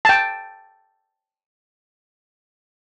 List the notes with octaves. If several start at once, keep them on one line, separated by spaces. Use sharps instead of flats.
G5 A5